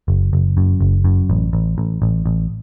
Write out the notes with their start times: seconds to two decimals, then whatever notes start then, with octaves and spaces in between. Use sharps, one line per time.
0.08 F#1
0.33 F#1
0.57 F#2
0.81 F#1
1.04 F#2
1.30 A1
1.53 A1
1.78 A1
2.02 A1
2.26 A1